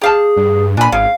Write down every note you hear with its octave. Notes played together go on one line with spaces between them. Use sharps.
G4 G#4 F5 A5
G2
A#2 D4 G#5 B5
G#1 C#3 F5